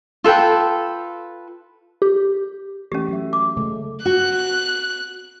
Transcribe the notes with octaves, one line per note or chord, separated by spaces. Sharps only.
F4 A4 B4 G5
G4
E3 A3 C#4 G4
F#3 E5
D6
C#3 G#3 A3
F#4 F#6